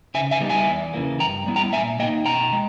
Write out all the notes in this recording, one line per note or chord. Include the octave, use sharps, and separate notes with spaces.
C#3 E5 G#5
E5 G#5
G3 B3 D#4
E5 G#5
E2
C#3 E3 A#3
G2 G5 A#5
G3 B3 E4
G5 A#5
A#2 E5 G#5
A#3 D#4 D#5 G5
B2 G5 A#5
G#3